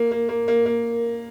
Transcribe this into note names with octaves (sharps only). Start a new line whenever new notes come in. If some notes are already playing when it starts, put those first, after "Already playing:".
Already playing: A#3
A#3
A#3
A#3
A#3